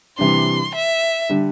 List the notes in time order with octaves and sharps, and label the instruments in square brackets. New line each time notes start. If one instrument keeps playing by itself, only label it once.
[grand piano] C3 E3 G3 D4 [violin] C6
[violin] E5
[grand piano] D3 G3